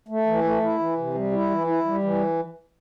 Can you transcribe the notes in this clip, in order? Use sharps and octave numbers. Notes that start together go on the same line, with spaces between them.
A3
E3
A3
E4
E3
C3
G3
E4
E3
E4
G3
E3